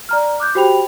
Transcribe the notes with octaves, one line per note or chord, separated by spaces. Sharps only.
D5 A#5 F6
D6 F#6 G6
F#4 G4 C5 G5 B5 F7